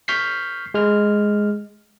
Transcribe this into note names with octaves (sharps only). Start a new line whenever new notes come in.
C#6 F6 G6 B6 C7
G#3 F6